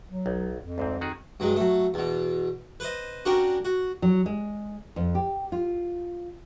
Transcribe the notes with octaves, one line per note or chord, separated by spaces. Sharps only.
F#3
B1
F2
D2 G#2 C4
D#3 F#4 G#4
G2 F#3 G#3
F#3 A3
E2 B2
B4 C5 D#5
C#4 D4 F#4 G4 A#4
F#4
F#3
G#3
F2
G4
F4